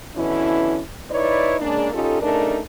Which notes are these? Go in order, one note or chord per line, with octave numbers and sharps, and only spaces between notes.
B2 D3 E3 C#4 E4
D#4 E4 B4 C#5 D5
C#3 G#3 A#3 D4
C#4 D#4 F4 G4 A4
C#3 A3 D4 D#4 A#4